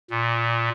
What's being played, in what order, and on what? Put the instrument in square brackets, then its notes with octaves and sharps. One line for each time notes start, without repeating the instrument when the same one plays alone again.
[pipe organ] A#2